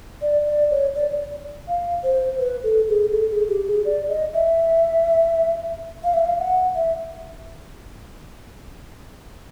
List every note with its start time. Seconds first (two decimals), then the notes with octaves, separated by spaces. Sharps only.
0.22 D5
0.47 D5
0.71 C#5
0.95 D5
1.68 F5
2.03 C5
2.39 B4
2.64 A4
2.89 G#4
3.12 A4
3.31 G#4
3.48 G4
3.68 G#4
3.85 D5
4.09 D#5
4.34 E5
6.04 F5
6.14 E5
6.26 F5
6.40 F#5
6.75 E5